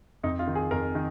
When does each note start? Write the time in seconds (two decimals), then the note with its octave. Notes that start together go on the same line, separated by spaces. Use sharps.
0.24 F2 D#4
0.39 F4
0.47 D#3
0.55 G#4
0.71 F2 A#4
0.95 D#3